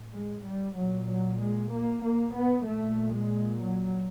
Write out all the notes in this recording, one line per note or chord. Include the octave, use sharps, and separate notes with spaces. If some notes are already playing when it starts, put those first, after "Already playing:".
Already playing: A2
G#3
G3
A#2 F#3
F#3
G#3
A#3
A#3
B3
A#2 A3
G#3
F#3